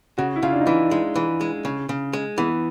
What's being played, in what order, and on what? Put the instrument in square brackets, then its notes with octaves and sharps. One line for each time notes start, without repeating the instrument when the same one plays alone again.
[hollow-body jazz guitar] C#3 [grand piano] F#4
[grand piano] E4
[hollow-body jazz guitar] C#3 [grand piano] F4
[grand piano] D4
D#4
[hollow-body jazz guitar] E3 [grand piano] E4
[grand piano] D4
[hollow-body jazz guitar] G#3 [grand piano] D#4
[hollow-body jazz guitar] E3
G#3
C#3
C#3
G#3
[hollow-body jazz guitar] E3 [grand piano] B3